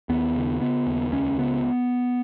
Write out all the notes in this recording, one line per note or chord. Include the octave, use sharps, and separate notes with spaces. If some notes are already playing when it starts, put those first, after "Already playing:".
D#2 B3
C#3
C#3 B3
D#2
C#2 C#4
C#3 B3